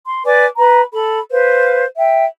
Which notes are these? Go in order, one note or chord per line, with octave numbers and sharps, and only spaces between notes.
C6
B4 D5 G#5 D6
B4 A#5 B5
A4 B5
B4 C5 F5
E5 G5